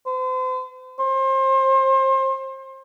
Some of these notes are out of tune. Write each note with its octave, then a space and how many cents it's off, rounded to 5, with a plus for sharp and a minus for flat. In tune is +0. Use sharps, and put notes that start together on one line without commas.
C5 -40
C5 +30